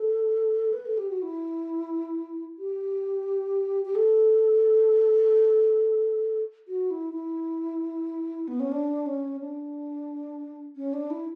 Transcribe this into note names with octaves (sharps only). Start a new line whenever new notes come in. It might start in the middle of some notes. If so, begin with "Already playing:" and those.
Already playing: A4
B4
A4
G4
F#4
E4
G4
G4
A4
F#4
E4
E4
B3
C#4
D4
C#4
D4
C#4
D4
E4